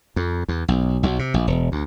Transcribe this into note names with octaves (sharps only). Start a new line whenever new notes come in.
F2
E2
B1
B1
C3
A#1
E1
D2